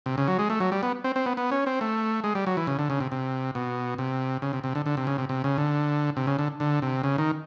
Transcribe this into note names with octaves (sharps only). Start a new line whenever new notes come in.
C3
C#3
F#3
G#3
A3
F#3
G3
B3
C4
C4
B3
B3
C#4
C4
A3
G#3
G3
F#3
E3
C#3
D3
C#3
C3
C3
B2
C3
C#3
C3
C3
D3
D3
C3
C#3
C3
C3
C#3
D3
C3
C#3
D3
D3
C3
C#3
D#3